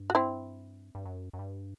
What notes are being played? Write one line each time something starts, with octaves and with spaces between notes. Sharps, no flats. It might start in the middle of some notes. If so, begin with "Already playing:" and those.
Already playing: G2
F#4
C4 E4
G2
F#2
F#2
G2